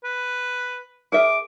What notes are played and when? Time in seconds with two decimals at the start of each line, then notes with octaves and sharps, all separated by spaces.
0.04 B4
1.12 G#4 A#4 E5 D6